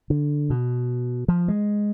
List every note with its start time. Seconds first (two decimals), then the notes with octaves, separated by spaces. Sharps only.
0.10 D3
0.50 B2
1.28 F3
1.48 G#3